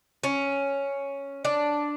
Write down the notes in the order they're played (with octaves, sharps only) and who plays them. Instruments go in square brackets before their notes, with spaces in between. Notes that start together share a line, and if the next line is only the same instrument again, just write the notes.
[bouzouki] C#4
D4